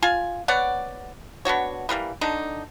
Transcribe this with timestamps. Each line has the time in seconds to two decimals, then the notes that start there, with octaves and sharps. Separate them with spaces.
0.02 F4 G#5
0.48 B3 C#5 D5 F#5
1.45 B3 D4 F#4 C#5
1.89 E3 G3 A#3 B3
2.21 D3 D4 D#4